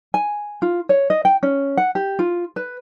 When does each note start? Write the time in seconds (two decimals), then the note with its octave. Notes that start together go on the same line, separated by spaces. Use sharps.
0.14 G#5
0.62 F4
0.89 C#5
1.10 D#5
1.25 G5
1.43 C#4
1.77 F#5
1.95 G4
2.19 F4
2.56 B4